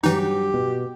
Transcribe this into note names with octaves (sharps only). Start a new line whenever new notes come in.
G2 E3 F#3 D#4 G4
B2